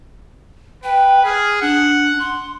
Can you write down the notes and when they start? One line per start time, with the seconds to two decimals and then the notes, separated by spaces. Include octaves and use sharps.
0.84 B4 G5
1.25 G#4 F6
1.62 D4 F#5
2.19 C6